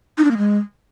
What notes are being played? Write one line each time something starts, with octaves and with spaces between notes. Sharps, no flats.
D#4
D4
A#3
G#3